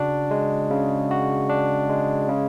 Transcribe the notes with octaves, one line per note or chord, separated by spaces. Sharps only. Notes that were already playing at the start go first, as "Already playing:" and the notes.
Already playing: C#3 D4 F#4
G#3
C#3
F#4
D4
G#3
C#3